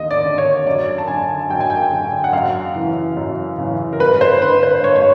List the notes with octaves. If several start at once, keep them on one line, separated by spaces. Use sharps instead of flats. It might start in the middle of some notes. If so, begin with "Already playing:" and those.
Already playing: D#2 D3 D#5
D5
D3
C#5
F#2 D5
A5
D3 G#5
F#2 G5
G#5
G5
D3
F#5
F#2 F5
C#3 E3
F#2
C#3 E3
A#4
G2 B4
C5
D3 B4
C5
G2 C#5
C#5